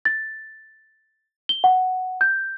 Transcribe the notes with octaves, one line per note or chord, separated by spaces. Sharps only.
A6
G7
F#5
G6